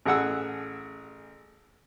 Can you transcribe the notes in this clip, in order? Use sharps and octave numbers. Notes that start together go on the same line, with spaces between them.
A1 G#4 F#5 E6